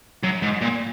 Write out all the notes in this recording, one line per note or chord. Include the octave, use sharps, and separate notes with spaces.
F#2
G#2
A#2